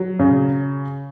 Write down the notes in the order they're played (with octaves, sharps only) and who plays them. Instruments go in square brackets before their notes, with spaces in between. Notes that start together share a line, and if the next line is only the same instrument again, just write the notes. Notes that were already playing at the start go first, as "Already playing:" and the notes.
Already playing: [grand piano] F#3
C#3